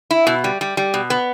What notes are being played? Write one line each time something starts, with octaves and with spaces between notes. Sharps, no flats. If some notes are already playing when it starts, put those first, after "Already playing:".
E4
B2
G3
G3
G3
B2
B3